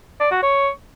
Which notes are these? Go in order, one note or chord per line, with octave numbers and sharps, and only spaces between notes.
D5
F#4
C#5